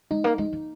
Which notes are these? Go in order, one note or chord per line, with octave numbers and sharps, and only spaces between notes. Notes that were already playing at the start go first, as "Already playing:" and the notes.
G#3 D#4
A#3
G#3 D#4
A#3